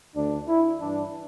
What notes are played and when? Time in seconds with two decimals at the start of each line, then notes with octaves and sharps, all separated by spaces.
0.16 D2 D3 D4
0.48 E4
0.81 G2 E3 D4